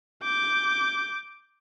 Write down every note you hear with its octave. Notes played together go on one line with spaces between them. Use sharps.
D6 G6